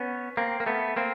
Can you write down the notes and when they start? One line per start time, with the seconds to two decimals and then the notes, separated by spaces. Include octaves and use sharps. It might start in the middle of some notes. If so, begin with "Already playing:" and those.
Already playing: B3 C#4
0.37 A#3 C4
0.60 A#3
0.66 A3 B3
0.96 A#3 C4